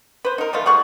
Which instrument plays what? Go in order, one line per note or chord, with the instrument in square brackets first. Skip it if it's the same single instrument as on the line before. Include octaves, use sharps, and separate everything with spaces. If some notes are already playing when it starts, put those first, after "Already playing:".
[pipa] B4 C5
D#4 A#4
D#3 E3 A3 F4
G3 G#4 F#5 C#6